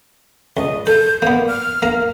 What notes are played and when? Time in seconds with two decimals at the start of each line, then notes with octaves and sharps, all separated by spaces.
0.57 C#2 D#5
0.87 A4 G6
1.22 A#3 B3 D5
1.48 F6
1.82 A#3 A#5